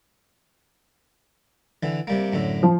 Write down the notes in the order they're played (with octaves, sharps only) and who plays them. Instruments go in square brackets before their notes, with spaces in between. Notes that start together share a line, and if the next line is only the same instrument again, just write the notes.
[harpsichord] D3 E3
C3 G3 A#3
F#2 A2 D3
[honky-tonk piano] F3